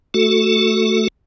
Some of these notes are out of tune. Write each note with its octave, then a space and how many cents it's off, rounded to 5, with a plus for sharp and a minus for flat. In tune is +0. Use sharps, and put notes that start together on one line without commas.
A3 +0 F#4 +0 A4 +0